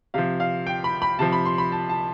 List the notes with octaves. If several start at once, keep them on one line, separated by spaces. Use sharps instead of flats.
C3 F3 F5
F5
G5
B5
B5
C3 F3 A5
B5
C6
B5
A5
A5